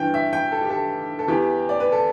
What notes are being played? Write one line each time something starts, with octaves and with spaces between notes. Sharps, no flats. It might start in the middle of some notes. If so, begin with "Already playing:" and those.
Already playing: G2 E3 G5
E5
G5
A4
G4
A4
A4
E2 E3 G4
D5
B4
A4